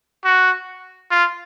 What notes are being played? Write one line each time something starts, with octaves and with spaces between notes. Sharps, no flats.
F#4
F4